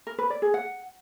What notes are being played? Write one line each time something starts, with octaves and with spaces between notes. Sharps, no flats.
A#4
B4
D5
G#4
F#5